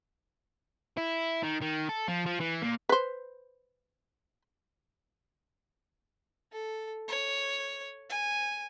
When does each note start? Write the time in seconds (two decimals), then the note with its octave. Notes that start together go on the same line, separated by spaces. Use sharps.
0.97 E4
1.43 D#3
1.61 D#3
1.89 A4
2.08 F3
2.26 F3
2.40 E3
2.62 A#2
2.89 B4 C5
6.52 A4
7.08 C#5
8.09 G#5